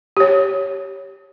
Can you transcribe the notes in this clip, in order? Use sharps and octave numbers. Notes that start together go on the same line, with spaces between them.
G4 C#5